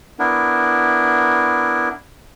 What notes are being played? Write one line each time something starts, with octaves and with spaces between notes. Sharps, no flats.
B3 D4 E4 A#4